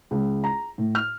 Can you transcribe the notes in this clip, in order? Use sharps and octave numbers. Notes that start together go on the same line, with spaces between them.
C#2
A#5
A2
F6